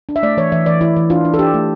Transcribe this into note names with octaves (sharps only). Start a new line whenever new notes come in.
D4
E5
A3 D5
E3 C#5
E3 E5
E3 D5
E3 E4
E3
D4 F4
D4
A4
D4 G4
A3